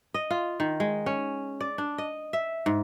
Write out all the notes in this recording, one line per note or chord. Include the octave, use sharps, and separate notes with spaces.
D#5
F4
D#3
G#3
C#4
D5
D4
D#5
E5
G#2